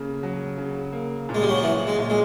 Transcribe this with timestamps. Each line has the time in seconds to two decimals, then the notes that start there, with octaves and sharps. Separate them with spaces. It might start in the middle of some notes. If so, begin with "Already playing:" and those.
Already playing: C#3 A#3
0.23 F#3
0.58 C#3
0.92 A#3
1.29 A#2
1.35 G#3
1.42 G3
1.49 F#3
1.56 F3
1.63 E3 F#3
1.87 G#3
1.99 A#2
2.10 G#3